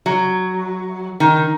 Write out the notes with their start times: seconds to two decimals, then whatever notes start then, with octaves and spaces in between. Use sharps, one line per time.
0.06 F#3
1.20 D#3